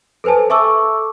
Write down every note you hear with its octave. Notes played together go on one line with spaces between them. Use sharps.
A4 B4 C5 G#5 A5
A4 E5 A5 C#6 D6 E6